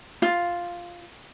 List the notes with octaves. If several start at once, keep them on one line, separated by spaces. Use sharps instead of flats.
F4